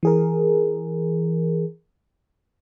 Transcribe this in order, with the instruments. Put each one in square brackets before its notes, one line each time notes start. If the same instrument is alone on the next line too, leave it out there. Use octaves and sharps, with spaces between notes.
[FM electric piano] E3 G#4 A#4